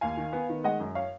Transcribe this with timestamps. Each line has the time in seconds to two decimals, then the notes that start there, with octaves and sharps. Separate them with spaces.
0.01 D#2 F5 G#5
0.17 D#3
0.33 B3
0.49 D#3
0.64 G#3 D#5 F#5
0.80 F#2
0.95 C#5 F5